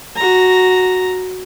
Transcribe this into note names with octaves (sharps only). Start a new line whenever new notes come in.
F#4 A#5